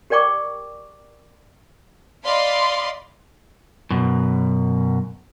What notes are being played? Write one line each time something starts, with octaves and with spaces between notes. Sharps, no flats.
G4 A#4 D5 G5 C#6 D6
D5 D#5 F5 B5 C6
F#2 B2